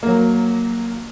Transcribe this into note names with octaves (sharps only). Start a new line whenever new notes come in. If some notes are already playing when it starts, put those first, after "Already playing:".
F#3 A#3